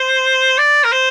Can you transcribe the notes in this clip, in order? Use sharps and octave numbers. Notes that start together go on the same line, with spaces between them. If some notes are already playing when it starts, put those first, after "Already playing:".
Already playing: C5
D5
A#4
C5